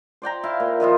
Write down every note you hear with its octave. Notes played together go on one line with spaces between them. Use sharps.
C5 D5 G5 A#5
E4 F5
A#2
D#3 F3 E4 F4